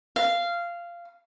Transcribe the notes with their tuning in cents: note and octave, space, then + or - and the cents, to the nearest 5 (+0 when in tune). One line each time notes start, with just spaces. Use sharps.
F5 -15